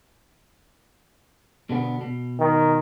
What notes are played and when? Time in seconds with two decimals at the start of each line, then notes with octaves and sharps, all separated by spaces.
1.70 B2 D3 B3
2.01 B2
2.39 D#3